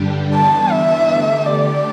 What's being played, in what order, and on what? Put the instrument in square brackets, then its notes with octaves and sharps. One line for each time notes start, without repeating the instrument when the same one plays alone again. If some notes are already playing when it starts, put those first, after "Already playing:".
Already playing: [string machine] G2 D3 G3 D4 G4
[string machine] E3 B3 D4 [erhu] A5
[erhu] E5
[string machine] D3 A3 G4
[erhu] D5